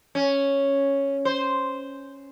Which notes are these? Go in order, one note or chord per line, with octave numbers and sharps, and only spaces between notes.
C#4
C5